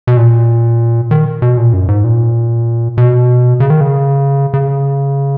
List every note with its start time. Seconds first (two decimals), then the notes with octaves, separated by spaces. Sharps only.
0.07 B2
0.17 A#2
1.11 D#3
1.42 B2
1.57 A#2
1.73 F#2
1.88 G#2
2.04 A#2
2.98 B2
3.60 C#3
3.70 D#3
3.81 C#3
4.54 C#3